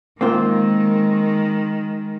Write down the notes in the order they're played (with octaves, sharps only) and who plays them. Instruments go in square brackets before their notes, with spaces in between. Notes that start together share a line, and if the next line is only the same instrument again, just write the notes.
[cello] D#3 G#3 [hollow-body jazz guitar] A#3 C4 F4